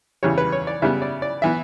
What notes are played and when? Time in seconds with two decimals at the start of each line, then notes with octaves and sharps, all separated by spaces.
0.23 E2 C#3 E3 G3 C#5
0.38 B4
0.52 C#5
0.67 D5
0.82 C#3 G3 B3 E5
1.02 D5
1.22 D5
1.42 E3 B3 E5